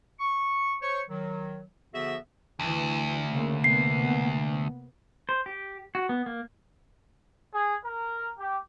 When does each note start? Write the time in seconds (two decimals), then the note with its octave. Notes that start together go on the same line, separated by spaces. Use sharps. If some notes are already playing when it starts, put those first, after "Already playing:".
0.20 C#6
0.82 C5 C#5 C#6
1.09 D#3 F#3
1.94 D3 F3 B3 F#4 G#4 E5
2.60 D2 E3
3.31 C#3 A#3
3.64 C3 A#3 B3 C7
5.29 C5
5.46 G4
5.95 F#4
6.09 B3
6.26 A#3
7.52 G#4
7.85 A#4
8.38 G4